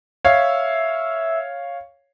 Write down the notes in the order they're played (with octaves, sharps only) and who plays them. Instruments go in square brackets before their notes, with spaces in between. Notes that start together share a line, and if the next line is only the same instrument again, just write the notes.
[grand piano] C#5 F5 [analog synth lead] E5